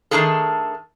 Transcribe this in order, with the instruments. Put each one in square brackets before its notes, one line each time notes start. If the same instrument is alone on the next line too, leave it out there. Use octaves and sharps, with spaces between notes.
[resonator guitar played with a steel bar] D#3 G#3 A3 D4 G#4 A4